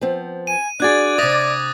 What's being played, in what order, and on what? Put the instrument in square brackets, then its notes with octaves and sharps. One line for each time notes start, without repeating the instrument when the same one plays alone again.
[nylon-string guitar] F3 B3 C4
[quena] G#5 [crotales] D#7
[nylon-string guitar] D4 F#4 G#4 [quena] D5 [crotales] F#6 G#6 A6
[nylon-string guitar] C3 E5 [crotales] D6 D#6 A#6